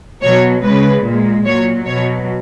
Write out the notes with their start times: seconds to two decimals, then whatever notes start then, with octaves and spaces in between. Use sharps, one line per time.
0.22 B2 F#3 C#5
0.63 C#3 G#3 B4
1.04 A#2 G#3
1.46 A#2 F#3 C#5
1.87 B2 F#3 C#5